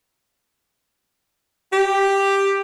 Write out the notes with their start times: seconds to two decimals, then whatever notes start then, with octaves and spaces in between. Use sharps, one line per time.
1.73 G4